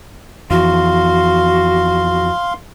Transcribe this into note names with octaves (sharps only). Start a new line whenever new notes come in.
F2 E3 F#4 F5 C6